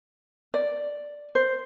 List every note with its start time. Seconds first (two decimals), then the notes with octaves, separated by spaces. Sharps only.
0.54 D5
1.35 C5